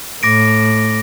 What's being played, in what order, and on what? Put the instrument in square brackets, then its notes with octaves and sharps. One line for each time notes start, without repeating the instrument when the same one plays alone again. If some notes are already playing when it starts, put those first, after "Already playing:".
[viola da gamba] A2 [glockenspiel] D6 A#6 D7